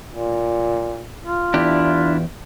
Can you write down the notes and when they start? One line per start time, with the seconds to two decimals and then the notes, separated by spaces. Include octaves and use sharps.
0.10 A#2
1.25 F4
1.54 E2 D4 E4 G4